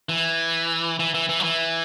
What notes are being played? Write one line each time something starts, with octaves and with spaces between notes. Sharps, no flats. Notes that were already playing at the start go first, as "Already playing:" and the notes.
E3
E3
E3
E3
F#3
E3